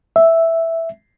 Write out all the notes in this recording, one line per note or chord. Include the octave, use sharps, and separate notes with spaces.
E5